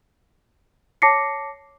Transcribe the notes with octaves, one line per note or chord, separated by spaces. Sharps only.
C#5 A5 D6 A#6 C7 C#7